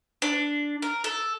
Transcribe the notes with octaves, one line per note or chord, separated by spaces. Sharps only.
D4
A#4
A4